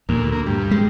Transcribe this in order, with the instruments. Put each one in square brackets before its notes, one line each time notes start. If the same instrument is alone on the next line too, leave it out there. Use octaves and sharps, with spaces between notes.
[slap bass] D2 [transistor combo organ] A#2
[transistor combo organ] A#3
G2
[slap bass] G#3